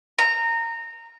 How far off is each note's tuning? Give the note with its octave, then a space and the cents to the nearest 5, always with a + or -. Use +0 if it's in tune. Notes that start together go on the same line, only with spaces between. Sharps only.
A#5 -20